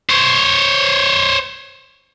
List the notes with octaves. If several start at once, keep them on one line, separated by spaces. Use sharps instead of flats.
C5 C#5